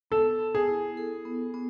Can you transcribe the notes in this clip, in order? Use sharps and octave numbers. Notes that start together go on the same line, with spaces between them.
B3 A4
B3
G#4
E4
A4
B3
B3